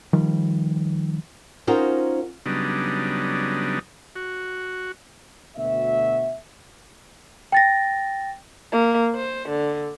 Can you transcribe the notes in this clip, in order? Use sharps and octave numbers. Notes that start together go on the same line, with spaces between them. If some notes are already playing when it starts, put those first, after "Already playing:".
D#3 F3 G3
C#4 D#4 F4 F#4 A#4 C5
C#3 F#3 G3 B3 D4 D#4
F#4
D2 B2 F#4 E5
G5 A6 A#6
A#3
C5
D3